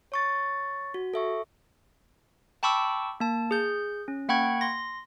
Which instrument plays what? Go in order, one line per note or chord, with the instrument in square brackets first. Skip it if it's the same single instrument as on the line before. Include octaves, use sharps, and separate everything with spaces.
[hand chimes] C#5 C#6 A6
F#4
A4 E5 C#6
[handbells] G5 A5 B5 C#6 D6 E6
A#3 A5
G#4 G6
C#4
A#3 F#5 G5 B5 C#6 G#6
C6 A#6